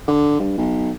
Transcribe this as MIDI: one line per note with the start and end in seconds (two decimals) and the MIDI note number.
0.08 0.36 50
0.40 0.57 43
0.57 0.91 35